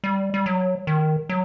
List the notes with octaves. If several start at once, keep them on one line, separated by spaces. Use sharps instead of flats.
G3
G3
F#3
D#3
F#3